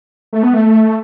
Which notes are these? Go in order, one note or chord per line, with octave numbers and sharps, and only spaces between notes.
A3
B3
A3